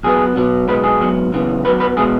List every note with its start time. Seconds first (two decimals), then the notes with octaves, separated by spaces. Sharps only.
0.03 B1 B2 B3 G#4
0.36 B1 B2 F#3 B3
0.68 B1 B2 G#3 B3 B4
0.84 G#4
1.00 G#2 F#3 B3
1.32 F#2 C#3 E3 B3
1.65 F#2 F#3 B3 B4
1.80 B4
1.97 B2 G#3 B3 G#4